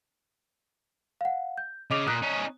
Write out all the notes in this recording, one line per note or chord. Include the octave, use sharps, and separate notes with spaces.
F5 F#5
G6
C#3 D#5 D6 F7
A#2 D#6 F#6
C#4 D#4